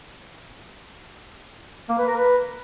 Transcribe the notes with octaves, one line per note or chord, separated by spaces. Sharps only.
A#3
B4
A#4
B4